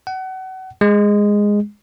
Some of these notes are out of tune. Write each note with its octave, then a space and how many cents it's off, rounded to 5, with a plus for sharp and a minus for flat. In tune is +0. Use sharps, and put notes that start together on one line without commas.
F#5 +30
G#3 -10